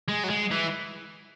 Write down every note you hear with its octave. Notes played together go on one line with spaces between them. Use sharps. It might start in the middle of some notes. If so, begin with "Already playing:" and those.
G#3
F#3
G#3
E3